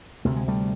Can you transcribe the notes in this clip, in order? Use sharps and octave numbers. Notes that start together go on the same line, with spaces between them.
D2 C3 A3
G#3
G3 A3